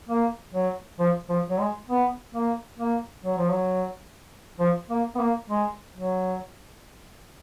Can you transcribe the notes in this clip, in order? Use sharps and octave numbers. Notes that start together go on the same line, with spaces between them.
A#3
F#3
F3
F3
F#3
G#3
B3
A#3
A#3
F#3
F3
F#3
F3
A#3
B3
A#3
G#3
F#3